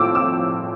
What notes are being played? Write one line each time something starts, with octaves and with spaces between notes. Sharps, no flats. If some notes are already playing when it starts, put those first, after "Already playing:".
Already playing: A2 F3 A3 C4 D6 E6
E6